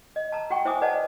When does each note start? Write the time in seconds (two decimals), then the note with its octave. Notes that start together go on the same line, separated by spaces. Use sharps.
0.16 D#5
0.32 A5 A#5
0.50 F#4 F#5 G5 C#6
0.65 E4 C5 E5 G#5 D6 D#6
0.81 B4 C5 D5 D#5 F#5 A5